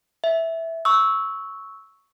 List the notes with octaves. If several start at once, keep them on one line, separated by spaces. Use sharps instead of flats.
E5
C#6 E6